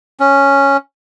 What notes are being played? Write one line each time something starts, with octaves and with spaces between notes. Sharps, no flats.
C#4